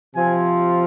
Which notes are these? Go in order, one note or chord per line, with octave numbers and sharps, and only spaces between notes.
C3 F3 C4 F4 G#5